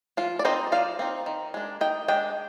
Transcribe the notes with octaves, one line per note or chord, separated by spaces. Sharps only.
F3 F4
D5
C4 D#4 C5 D#5
F3 D5 F5
C4 D#4
D#3
G#3 D4
D#3 D#5 G5
G#3 D4 D#5 G5